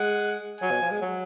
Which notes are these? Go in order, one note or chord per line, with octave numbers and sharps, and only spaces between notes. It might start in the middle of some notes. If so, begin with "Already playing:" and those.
Already playing: G#3 F#5
F#3 G#5
B2
F3
G#3
F#3